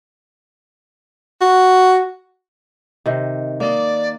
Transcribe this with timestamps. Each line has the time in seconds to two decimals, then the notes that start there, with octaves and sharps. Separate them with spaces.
1.41 F#4
3.06 C3 D#3
3.60 A#3 D5 D#5